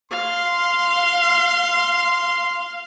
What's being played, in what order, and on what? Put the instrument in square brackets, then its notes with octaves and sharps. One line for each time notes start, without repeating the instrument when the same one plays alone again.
[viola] F5 [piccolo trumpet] C6